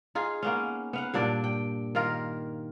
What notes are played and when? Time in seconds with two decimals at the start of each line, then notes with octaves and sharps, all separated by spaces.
0.15 D#4 F4 G#4
0.43 A#3 B3 C#4
0.93 B3 F5 F#5
1.14 G2 A#2 D4 D5
1.44 G5
1.95 D#3 A#3 F4 A#4